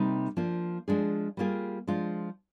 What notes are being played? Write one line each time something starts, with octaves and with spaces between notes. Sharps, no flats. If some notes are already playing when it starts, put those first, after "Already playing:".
Already playing: C3 G3 A#3 D#4 G4
F3 A#3 D4 F4
F3 G#3 D4 G#4
G3 A#3 F4 G#4
F3 G#3 D4 F4